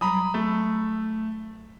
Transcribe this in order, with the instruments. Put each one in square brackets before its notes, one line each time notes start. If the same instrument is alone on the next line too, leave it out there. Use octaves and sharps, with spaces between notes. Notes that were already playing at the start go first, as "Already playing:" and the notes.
[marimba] F#3 G3 [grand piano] A#5 B5 D#6
[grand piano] A3